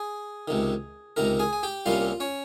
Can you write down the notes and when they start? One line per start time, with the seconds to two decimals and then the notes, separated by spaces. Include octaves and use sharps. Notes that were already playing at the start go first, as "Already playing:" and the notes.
Already playing: G#4 G#5
0.48 C#2 C3 D#3
1.17 C#2 C3 D#3 A#4 A#5
1.39 G#4 G#5
1.53 G#5
1.63 G4 G5
1.86 C2 C3 G3 A#3 C#4 F4 F5
2.20 C#4 C#5